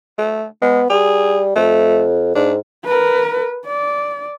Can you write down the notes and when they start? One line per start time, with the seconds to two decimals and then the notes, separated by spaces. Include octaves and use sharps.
0.18 A3
0.62 G#3 B3
0.90 G3 G#4
1.56 F2 A3
2.35 G#2 D4
2.85 A#4 B4
3.66 D5